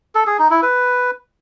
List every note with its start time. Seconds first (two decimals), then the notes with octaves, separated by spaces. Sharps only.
0.15 A4
0.27 G#4
0.39 D#4
0.51 E4
0.63 B4